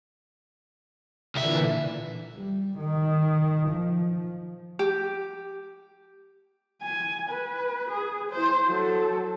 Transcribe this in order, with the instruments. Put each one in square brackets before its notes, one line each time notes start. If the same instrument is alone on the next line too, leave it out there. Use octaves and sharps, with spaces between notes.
[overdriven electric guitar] C2 E5 [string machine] A#2 D3 E3
[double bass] G3
D#3
F3
[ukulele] G4
[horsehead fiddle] G#5
B4
G#4
E4 C5
F#3 A4